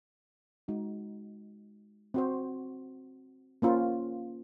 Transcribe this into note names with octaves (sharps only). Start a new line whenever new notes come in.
G#3 D#4 F#4
C4 F#4 C5
A#3 C#4 F4 C5